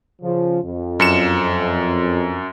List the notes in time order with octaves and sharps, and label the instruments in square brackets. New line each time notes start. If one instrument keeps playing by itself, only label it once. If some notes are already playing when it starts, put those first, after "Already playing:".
[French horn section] C#3 F3
F2
[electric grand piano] F#2 C#7 E7